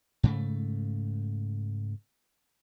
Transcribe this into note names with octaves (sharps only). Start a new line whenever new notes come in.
G#2 C#3 A3